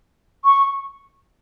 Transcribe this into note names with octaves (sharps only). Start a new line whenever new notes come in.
C#6